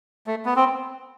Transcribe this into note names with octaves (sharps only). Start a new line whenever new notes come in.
A3
B3
C4